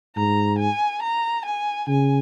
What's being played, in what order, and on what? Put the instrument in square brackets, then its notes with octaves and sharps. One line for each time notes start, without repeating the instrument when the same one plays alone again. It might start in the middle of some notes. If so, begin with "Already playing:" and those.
[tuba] G#2 [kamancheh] A#5
[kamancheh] G#5
A#5
G#5
[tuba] C#3 [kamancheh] G#5